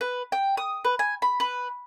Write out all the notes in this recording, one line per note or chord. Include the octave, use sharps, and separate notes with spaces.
B4
G5
D#6
B4
G#5
B5
B4